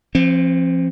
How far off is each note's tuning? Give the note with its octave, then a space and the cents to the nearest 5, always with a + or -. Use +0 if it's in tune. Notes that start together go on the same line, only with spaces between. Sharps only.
F3 -30 C4 +30